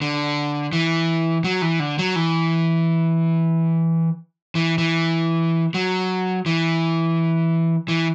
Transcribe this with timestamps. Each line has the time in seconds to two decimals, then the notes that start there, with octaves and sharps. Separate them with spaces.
0.02 D3
0.73 E3
1.44 F#3
1.62 E3
1.80 D3
1.99 F#3
2.16 E3
4.55 E3
4.78 E3
5.74 F#3
6.46 E3
7.88 E3